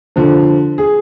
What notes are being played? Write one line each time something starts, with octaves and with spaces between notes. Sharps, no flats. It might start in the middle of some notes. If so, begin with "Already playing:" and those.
D3 F3
G#4